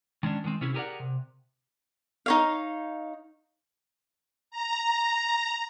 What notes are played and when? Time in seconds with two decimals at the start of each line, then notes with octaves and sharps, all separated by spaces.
0.23 D#3 G#3 C#4 D4
0.44 D3 D#3 G#3 C4
0.61 C3 C#4 E4 G#4
0.74 G4 G#4 A#4 C5 D5 F#5
1.00 C3
2.26 D#4 C#5 F5
4.51 A#5